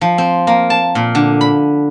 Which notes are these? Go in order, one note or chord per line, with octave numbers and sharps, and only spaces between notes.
F3
C4
A#3
A5
A#2
D3
B5